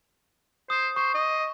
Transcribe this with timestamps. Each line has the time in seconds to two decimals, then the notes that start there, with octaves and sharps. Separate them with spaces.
0.70 C5 D#6
0.96 C5 C#6
1.15 D#5